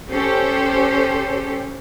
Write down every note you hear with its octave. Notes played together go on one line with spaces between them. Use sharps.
C#4 G4 A4 C5